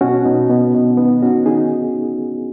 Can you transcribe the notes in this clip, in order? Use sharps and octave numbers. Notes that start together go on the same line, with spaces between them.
B2 C#4 F#4
B2 B3 D#4
B2 B3
B2
D#3 B3
D#3 C#4 F#4
D#3 D#4 G#4